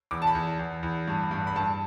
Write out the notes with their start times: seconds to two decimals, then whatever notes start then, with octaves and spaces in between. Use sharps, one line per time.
0.11 E2 D6
0.22 A5
0.27 B5
0.35 E2
0.59 E2
0.83 E2
1.07 G2
1.31 G2
1.47 B5
1.56 G2 A5